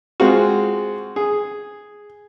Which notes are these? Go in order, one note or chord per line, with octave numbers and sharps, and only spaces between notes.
G#3 C4 F4 F#4
G#4